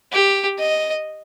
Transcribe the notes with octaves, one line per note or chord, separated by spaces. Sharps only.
G4
D#5